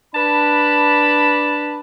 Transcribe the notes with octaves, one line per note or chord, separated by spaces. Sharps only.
D4 B4 A5 B5